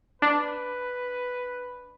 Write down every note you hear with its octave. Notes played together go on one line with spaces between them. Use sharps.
D4 B4